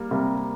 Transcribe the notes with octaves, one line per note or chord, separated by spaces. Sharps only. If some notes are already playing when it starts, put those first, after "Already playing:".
Already playing: G3 A#3
C3 G3 A#3